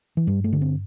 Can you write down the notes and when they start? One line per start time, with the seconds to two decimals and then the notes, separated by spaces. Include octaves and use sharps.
0.17 E3
0.27 G2 G3
0.44 A3
0.53 D3
0.61 C4